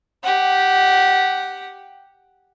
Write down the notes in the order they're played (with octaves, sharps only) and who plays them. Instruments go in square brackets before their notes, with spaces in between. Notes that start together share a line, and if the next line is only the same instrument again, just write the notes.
[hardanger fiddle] G4 F#5